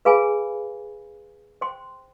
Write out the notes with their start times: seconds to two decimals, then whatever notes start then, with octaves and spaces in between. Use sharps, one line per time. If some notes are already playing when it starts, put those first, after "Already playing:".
0.05 G#4 B4 F5 G#5 B5
1.61 C5 G5 C6